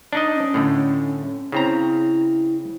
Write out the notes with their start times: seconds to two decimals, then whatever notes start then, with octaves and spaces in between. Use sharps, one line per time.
0.13 D4 D#4 D#5
0.35 C#4
0.54 A2 D3 A3
1.52 C#3 C4 E4 A#5